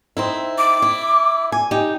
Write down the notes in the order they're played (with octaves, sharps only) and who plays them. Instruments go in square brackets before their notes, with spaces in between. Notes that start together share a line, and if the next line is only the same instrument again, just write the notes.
[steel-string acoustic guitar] C4 D#4 E4
[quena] D6
[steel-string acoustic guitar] E4
G#5
D#4 G4